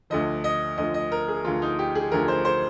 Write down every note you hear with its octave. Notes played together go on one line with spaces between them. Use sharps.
D2 D3 F3 D#5
D#5
D2 D3 F3 D#5
D#5
A#4
G#4
D2 D3 F3 F4
D#4
G4
G#4
D2 D3 F3 A#4
C5
C5